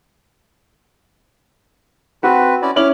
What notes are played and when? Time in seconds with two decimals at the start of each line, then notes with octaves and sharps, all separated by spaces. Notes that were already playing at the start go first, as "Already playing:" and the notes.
2.23 C4 F#4 B4
2.62 C#4 E4 D5
2.76 C#4 E4 D6 F6 F#7